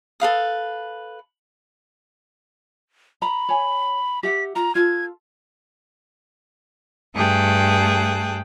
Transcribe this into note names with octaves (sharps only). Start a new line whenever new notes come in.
A4 B4 F5 D#6
A#5 B5
C#5 G#5
G4 E5 F#5 B6
F4 A#5
F4 A4 G#6
G2 A3 G#4 G5 A5 F#6